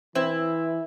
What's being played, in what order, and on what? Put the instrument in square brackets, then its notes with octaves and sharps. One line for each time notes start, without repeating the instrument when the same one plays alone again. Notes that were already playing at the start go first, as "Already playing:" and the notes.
[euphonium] E3 [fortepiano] C4 [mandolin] E4